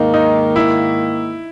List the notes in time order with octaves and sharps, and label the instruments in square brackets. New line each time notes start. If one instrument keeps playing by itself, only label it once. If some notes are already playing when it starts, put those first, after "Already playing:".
Already playing: [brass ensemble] G#2 D#3 A#3 [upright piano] D#4
[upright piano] D#4
E4